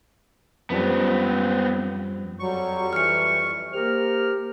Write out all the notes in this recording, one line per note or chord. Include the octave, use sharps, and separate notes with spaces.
F#2 F3 G3 B3 C4
F2 F#3 G3 C#6
E3 F6 C#7
A#3 G4 A#4 C5 F6